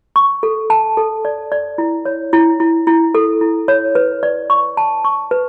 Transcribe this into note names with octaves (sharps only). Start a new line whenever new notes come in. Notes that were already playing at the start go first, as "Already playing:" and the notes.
C#6
A4
A5
A4
D5
D5
E4
C#5
E4
E4
E4
A4
E4
C#5
B4
D5
C#6
A5
C#6
B4